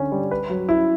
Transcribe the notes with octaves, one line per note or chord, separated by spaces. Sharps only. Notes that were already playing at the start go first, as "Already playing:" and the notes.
Already playing: D3 C#4
G3
B4
F#3
E4